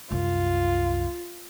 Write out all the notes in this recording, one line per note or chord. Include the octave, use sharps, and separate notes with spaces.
C2 F#2 F4